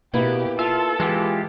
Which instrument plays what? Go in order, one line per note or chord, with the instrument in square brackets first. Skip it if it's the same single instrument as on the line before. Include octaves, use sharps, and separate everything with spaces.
[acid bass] B2 [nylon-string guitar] A#3 B3 E4 [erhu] G4
[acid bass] F4 [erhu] A4 [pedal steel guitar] E5
[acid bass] E3 [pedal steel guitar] G#3 F4 G4